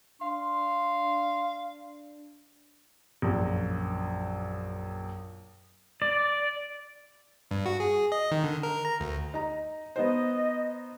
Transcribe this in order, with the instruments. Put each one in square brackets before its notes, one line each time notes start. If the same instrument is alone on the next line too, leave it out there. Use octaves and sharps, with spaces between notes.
[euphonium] D4 [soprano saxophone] F5 [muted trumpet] C6
[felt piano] A#1 F#2
[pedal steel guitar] D5
[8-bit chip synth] G2
F#4
G#4
D#5
D#3
D3
A#4
A#5
D2
[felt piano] D#4 A#5
[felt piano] B3 D#4 C5 [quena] D#5